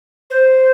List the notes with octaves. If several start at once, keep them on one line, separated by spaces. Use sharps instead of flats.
C5